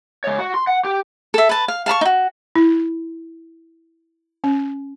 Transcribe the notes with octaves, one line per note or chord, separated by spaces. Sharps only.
G#3 C#5
F#4
C6
F#5
G4
A4 E5
B4 A5
F5
F5 A5 B5 C#6
D#4 F#4
E4
C#4